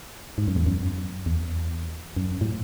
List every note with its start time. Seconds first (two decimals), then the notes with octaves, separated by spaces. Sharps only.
0.38 G#2
0.48 F#2
0.56 E2
0.66 F#2
1.26 E2
2.17 F#2
2.41 A2